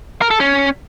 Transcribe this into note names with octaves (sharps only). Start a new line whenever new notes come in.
A#4
A4
C#4